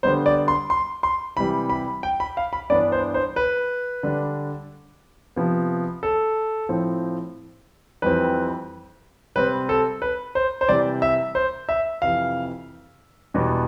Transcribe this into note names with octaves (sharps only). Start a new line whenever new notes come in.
D3 G3 B3 C5
D5
C6
C6
C6
C3 E3 G3 B5
B5
G5
B5
F5
B5
G2 E3 B3 D4 D5
C5
C5
B4
D3 G3 D4
C3 F3 B3
A4
A2 F3 C4
F2 E3 G3 C4 B4
C3 G3 C4 B4
A4
B4
C5
C5
C3 E3 G3 D5
E5
C5
E5
F2 C3 E3 F5
E2 B2 G3 B3